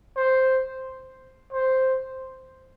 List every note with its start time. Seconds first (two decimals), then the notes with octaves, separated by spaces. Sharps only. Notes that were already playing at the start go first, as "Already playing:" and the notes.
0.16 C5
1.52 C5